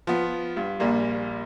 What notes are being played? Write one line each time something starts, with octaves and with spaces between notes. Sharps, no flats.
F3 B3
G2
A#1 A#2 G3 A#3